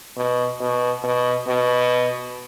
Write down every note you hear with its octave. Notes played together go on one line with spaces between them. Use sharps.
B2
B2
B2
B2